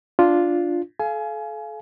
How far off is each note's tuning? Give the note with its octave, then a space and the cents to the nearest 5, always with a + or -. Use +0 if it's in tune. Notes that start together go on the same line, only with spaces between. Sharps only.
D4 +0 F4 +0
A4 -35 F5 -20 G#5 +25